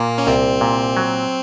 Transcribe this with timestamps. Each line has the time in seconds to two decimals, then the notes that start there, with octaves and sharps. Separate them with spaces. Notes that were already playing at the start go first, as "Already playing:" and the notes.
Already playing: A#2 A#3
0.18 C#4
0.27 C2 C4
0.61 A#2
0.97 F#3